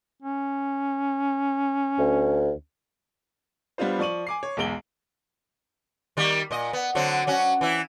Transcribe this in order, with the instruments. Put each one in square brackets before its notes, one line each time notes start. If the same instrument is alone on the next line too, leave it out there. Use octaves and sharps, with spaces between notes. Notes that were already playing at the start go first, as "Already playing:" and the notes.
[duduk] C#4
[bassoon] D2
[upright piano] G3 B3 D4 F4 C5
F3 D5 C#6 D#7 F#7
G#5 D6 C7
C#5
B1 E2 G#3 D7 F#7 G7
[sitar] D#3 G3 A#3
A#2 D#5
B3
D3 F#3 C4
F#3 C#4 F#4
E3 E4